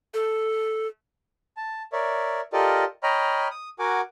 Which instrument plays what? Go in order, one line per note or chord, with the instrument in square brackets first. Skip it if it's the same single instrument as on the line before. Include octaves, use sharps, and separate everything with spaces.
[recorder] A4
[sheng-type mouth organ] A5
A#4 C#5 D5 E5
F4 G4 A4 A#4 D5 D#5
C#5 D#5 G5 A#5 B5 F6
D#6
F#4 A#4 F#5 G#5 D6